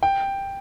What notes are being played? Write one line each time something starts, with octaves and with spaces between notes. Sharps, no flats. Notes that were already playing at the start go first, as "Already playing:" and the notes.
G5